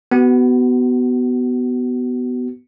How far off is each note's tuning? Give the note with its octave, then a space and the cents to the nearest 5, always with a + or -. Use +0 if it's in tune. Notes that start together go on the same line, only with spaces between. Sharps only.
B3 +10 F#4 +35